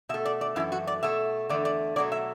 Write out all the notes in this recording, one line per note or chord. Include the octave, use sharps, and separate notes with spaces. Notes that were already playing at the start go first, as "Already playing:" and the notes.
B2 A3 E5
D5
D5
F#2 E3 A3 E4
F#4
D5
B2 A3 E5
E2 D3 A3 D5
D5
B2 F#3 A3 D5
E5